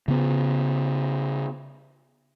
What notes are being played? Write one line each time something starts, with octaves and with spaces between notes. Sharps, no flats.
C#3 B3